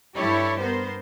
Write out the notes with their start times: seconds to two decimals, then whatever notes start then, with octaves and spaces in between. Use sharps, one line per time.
0.16 G2 E4 G4 A4 C#5
0.59 B3 A#4 C5